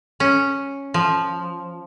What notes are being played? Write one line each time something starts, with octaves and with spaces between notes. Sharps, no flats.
C#4
F3